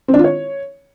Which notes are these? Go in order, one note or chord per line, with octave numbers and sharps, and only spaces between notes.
C4
D4
F4
C#5